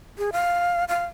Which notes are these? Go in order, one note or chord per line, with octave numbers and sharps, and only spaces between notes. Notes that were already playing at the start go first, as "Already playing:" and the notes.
G#4
F5
F5